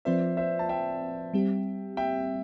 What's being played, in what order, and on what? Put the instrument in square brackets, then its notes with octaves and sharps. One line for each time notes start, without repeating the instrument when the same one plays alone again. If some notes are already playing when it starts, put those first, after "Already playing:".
[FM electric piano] F3 C4 F4 B4 D5 [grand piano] C5 E5
[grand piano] C5 E5
A5
E5 G5
[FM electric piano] G3 C4 G4
[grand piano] E5 G5